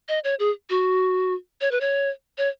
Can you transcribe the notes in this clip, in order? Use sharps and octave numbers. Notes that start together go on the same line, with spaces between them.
D#5
C#5
G#4
F#4
C#5
B4
C#5
C#5